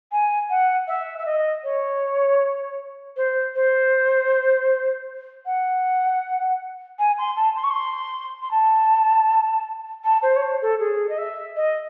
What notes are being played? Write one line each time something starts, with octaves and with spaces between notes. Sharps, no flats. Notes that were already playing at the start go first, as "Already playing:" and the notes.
G#5
F#5
E5
E5
D#5
C#5
C5
C5
F#5
G#5
C6
A5
C6
C#6
C6
C6
A5
A5
C5
C#5
C5
A4
G#4
D#5
E5
D#5